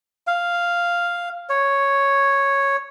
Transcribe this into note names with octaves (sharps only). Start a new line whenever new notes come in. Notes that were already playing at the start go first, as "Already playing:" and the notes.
F5
C#5